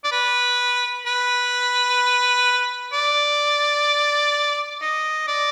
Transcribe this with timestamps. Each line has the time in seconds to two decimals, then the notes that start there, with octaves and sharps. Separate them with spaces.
0.04 D5
0.12 B4
1.06 B4
2.93 D5
4.82 D#5
5.28 D5